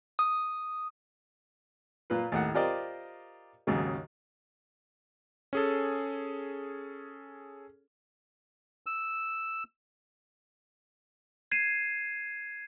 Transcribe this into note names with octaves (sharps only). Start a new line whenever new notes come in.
D#6
A#2 F4 B4
D#2 A2 F#5
F4 G4 A#4 C5 D5 D#5
D#2 G#2 C#3 F#3
C#4 G#4 A4
E6
G#6 C7 D#7 E7